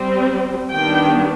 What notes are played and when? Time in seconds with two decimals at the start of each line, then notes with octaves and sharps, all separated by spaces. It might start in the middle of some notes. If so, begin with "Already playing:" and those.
Already playing: G3 C4
0.72 D#3 G3 B3 D4 G5